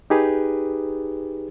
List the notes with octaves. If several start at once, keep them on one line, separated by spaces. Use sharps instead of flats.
D#4 G4 G#4 B4